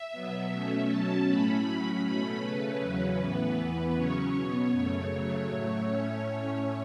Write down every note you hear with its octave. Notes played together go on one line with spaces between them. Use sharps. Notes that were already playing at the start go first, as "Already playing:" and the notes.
Already playing: E5
B2 F#3 B3
B2 A3 C#4
B2 F#3 C#4 A5
A2 A3 C#4 B5
A2 F#3 C#4
B2 A3 C#4 B5
C#3 A3 C#4 B4
E2 C#3 F#3 C#4
A2 E3 B3
E2 E3 B3
C#3 F#3 C#4 C#5
B2 B3 C#5
F#2 C#3 A3
C#3 F#3 A3
A2 F#3 A3
A2 A3 C#4 C#5